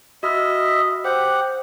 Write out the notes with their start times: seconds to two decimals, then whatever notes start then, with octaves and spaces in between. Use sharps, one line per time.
0.23 F#4 D#5 E5 B5 F6
1.04 G4 C5 F#5